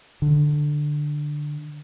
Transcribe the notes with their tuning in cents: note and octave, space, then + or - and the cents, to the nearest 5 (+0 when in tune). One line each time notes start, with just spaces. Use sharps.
D3 +10